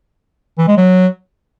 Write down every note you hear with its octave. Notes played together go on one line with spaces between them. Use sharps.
E3
G#3
F#3